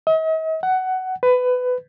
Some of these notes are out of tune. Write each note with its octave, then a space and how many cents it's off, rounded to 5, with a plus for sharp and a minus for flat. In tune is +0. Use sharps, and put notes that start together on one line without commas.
D#5 +45
F#5 +15
B4 +20